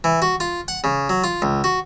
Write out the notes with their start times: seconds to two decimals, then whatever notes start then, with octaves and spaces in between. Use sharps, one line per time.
0.04 E3
0.22 F#4
0.40 F4
0.68 F#5
0.84 C#3
1.09 F#3
1.24 F4
1.42 C#2
1.64 F#4